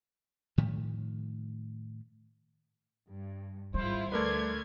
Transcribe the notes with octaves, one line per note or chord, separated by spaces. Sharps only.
A2 D#3 F3 A3
G2
G#1 G3 E4 F4 C5
D2 A3 A#4 B4 D5 C6 G#6